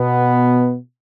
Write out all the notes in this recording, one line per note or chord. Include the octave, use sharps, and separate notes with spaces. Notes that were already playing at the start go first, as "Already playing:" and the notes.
Already playing: B2 B3